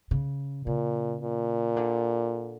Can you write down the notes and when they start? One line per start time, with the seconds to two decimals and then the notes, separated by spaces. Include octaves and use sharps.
0.11 C#3
0.66 A#2 C#3
1.21 A#2
1.76 D3